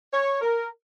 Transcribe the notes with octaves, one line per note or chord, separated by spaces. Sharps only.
C#5
A#4